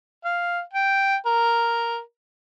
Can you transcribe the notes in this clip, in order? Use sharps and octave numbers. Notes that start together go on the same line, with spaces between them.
F5
G5
A#4